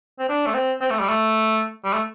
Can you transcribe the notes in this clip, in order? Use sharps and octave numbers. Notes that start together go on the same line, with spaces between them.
C4
D4
A3
C4
C4
A3
G3
A3
G3
A3